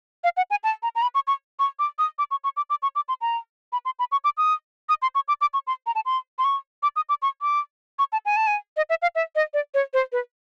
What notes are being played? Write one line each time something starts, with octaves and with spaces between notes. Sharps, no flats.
F5
F#5
G#5
A5
A#5
A#5
B5
C#6
C#6
C#6
D6
D#6
D6
C#6
C#6
D6
D6
C#6
D6
C6
A#5
B5
C6
B5
C#6
D6
D#6
D#6
C6
C#6
D6
D6
C#6
C6
A#5
A5
C6
C6
C#6
D6
D#6
D6
C#6
D6
C#6
A5
G#5
A5
G#5
D#5
E5
F5
E5
D#5
D5
C#5
C5
B4